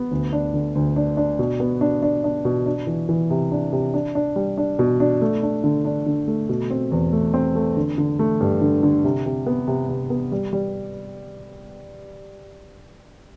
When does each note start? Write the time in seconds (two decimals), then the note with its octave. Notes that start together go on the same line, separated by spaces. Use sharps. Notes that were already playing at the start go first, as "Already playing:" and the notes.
Already playing: B3
0.11 D2
0.33 D4
0.54 D3
0.75 D2
0.96 D4
1.17 D4
1.39 B2
1.60 B3
1.81 D4
2.03 D4
2.24 D4
2.45 B2
2.66 D4
2.87 E3
3.09 E3
3.31 C3
3.52 D4
3.72 C3
3.94 D4
4.15 D4
4.36 G3
4.57 D4
4.79 B2
5.00 D4
5.21 A3
5.43 D4
5.64 D3
5.85 D4
6.06 D3
6.28 A3
6.49 B2
6.71 C4
6.92 E2
7.13 A3
7.34 C4
7.55 A3
7.77 D3
7.98 D3
8.19 A3
8.41 G2
8.62 D3
8.83 D3
9.04 C3
9.26 C3
9.46 B3
9.68 C3
9.89 C3
10.10 B3
10.32 G3
10.53 G3